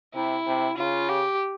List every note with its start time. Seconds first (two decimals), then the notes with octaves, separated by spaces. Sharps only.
0.14 C3 E4
0.46 C3
0.78 C#3 F4
1.09 G4